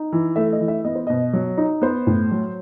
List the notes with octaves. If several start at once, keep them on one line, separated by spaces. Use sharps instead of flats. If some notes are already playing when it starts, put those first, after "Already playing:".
Already playing: D#4
E3
A3 E5
D#5
E3
E5
B3 D#5
C5
B2 D#5
F#3
D#4
B3 C5
A2
F#3